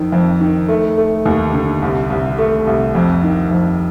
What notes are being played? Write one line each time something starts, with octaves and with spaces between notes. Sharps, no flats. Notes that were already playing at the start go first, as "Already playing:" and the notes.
Already playing: F2 D#3
F2
D#3
A3
A3
D#2
D3
C2
C2
A3
C2
F2
D#3
F2